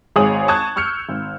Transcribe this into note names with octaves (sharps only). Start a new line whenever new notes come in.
G#1 G#3 G#4 C#5 D#6 F#7
A5 C#6 D#6 F#6 G#6
C#6 E6 F6 G6 C#7
G#1